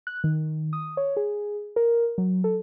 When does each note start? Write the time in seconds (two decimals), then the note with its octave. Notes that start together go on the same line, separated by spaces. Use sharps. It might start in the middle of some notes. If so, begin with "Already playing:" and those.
0.07 F#6
0.24 D#3
0.73 D#6
0.97 C#5
1.17 G#4
1.76 A#4
2.18 F#3
2.44 A4